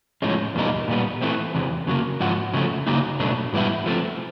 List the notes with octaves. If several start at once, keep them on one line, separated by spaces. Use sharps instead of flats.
A2 F3 G#3 C#4
E2 B2 G3 A#3 D#4
A#2 G3 B3
E3 A3 C4
E2 C3 E3
C#3 F#3 A#3
G#2 F3 F#4
C#3 F3 A3
C#3 F#3 A#3 D#4
B2 F#3 A3 D4
G#2 E3 G3 B3 E4
F3 A3 C4